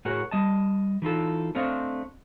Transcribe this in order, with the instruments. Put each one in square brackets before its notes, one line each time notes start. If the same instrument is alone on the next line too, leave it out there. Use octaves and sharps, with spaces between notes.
[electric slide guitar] A2 F#4 G#4 A#4 C#5 F#5
G3 D#5 A5
E3 D#4 F4 A4
A3 C4 D4 C5 D#5 F5